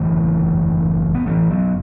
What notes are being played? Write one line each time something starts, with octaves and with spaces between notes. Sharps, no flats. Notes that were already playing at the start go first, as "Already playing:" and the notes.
Already playing: F#1 D3 E3 A3
B3
E3 A3
F#3 B3